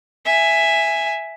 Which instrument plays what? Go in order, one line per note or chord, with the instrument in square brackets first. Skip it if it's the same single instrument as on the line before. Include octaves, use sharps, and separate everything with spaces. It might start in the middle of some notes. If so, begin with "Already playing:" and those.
[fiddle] E5 G#5